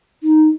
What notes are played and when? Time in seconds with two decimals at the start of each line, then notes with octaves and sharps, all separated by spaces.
0.23 D#4